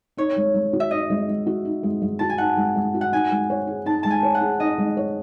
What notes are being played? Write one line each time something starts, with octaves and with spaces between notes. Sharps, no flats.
D#4 C#5
G#3
G#3
F#4
E5
D#4 D#5
G#3
G#3
F#4
D#4
G#3
G#3
F#4 A5
G#5
D#4 F#5
G#3
G#3
F#4
F#5
D#4 G#5
G#3
C#5
G#4
D#4 A5
G#3 A5
G#5
C#5
F#5
G#4
D#4 D#5
G#3
C#5